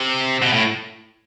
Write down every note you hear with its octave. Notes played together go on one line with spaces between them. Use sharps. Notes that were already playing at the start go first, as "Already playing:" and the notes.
Already playing: C3
B2
A2